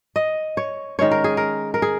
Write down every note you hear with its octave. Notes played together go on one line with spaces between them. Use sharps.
D#5
C#5
D#3 G#3 C#4 C#5
A#4
G#4
A#4
A#4
G#4